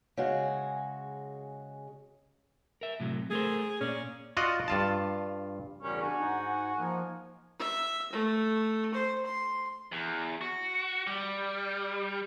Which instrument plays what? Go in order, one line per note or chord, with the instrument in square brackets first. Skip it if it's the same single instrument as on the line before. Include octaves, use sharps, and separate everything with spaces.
[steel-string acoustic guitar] C#3 G#3 F#4
[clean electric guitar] A#4 E5
A2 C3 F#3
[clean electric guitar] A3 A#4 C5 [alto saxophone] G#4
[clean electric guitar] A#2 D5 [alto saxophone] C#4
[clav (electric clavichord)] F4 F#4 D5 D#5 F#5
G2 F4 A5
[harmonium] E2 G3 A#4 [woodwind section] C#3 F#4 G4 [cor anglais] C#4
[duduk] D4 [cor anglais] F#4 [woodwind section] G#5
[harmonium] G#2 F#5 [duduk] D#4
[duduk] F3 [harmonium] A#3 D#4 A#4
[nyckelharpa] E5
A3
C5
C6
[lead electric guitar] E2
F#4
G3